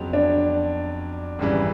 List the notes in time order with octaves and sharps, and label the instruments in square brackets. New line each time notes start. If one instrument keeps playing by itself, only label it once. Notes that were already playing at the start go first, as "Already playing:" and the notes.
Already playing: [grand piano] F2 C#3 F#3 B3
[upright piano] D4
[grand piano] G#1 F#2 C#3 E3 G3